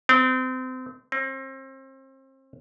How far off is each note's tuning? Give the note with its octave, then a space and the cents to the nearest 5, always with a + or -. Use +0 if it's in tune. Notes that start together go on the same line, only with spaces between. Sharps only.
C4 -30
C4 +35